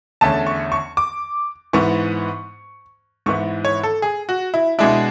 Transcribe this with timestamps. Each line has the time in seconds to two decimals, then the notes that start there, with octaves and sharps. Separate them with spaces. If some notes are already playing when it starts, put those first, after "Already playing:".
0.21 E2 D3 A3 C#4 A5
0.47 C#6
0.72 C#6
0.97 D6
1.73 G#2 E3 B3 C#6
3.26 G#2 E3 B3 E4 C#6
3.65 C#5
3.83 A4
4.02 G#4
4.29 F#4
4.54 E4
4.79 B2 G#3 D4 E4